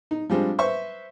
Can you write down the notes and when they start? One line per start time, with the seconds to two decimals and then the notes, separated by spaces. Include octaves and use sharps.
0.11 D#4
0.30 F3 G3 G#3 C4 D4
0.58 B4 C5 E5 C#6